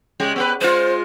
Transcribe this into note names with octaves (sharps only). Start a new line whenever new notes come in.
C#3 G#3 G4
B3 G4 B4
G#3 F4 C5